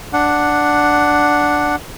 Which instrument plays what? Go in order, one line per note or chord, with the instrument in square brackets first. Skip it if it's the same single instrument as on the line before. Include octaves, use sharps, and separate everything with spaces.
[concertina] D4 F#5